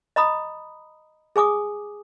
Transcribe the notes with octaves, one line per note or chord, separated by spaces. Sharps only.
D#5 A#5 B5 D#6
G#4 G#5 D6 D#6